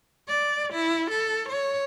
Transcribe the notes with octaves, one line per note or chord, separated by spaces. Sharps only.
D5
E4
A4
C#5